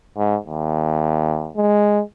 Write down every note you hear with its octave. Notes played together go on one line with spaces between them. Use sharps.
G#2
D#2
G#3